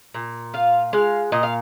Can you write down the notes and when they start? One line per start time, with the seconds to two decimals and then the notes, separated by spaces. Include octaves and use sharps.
0.14 A#2
0.54 F4 F5
0.93 G#3 F5
1.32 A#2 D#5
1.43 F5